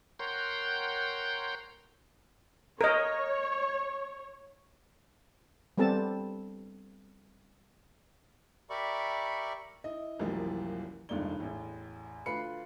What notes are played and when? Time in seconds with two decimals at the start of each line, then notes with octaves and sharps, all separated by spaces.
0.19 A#4 C#5 F#5 G5 C6 G6
2.81 A#4 C#5 D#5
5.78 G3 B3 C4 A4 A5
8.70 G4 A#4 D5 E5 B5 C#6
9.84 E4 D#5
10.19 C2 F#2 E3 F3 G3 A#3
11.09 F1 C#2 G2 D#3 D5 G7
11.40 A1 E2
12.26 D2 F4 B4 B5 C7 C#7